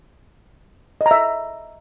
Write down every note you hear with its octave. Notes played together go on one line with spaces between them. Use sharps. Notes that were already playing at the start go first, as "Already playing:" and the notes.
D#5
A#5
E5